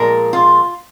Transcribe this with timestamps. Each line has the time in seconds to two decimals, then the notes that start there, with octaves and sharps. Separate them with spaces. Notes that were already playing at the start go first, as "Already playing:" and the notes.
Already playing: A#2 F3 G#3 A#4
0.33 F4